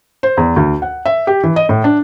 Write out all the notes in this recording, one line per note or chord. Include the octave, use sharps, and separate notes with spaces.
C5
E2
D2
F#5
E5
G4
E3
D#5
A2
D4